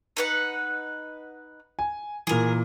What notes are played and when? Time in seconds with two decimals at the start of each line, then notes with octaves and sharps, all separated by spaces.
0.17 D#4 B4 F#5
1.79 G#5
2.27 A#2 E3 G#4 A#4